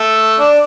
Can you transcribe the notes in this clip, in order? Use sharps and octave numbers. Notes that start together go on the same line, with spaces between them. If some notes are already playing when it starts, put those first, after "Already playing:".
Already playing: A3
D4